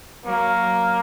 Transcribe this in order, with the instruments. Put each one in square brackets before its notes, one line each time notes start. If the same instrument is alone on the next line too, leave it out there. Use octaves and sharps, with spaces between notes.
[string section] F#3 [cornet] A#3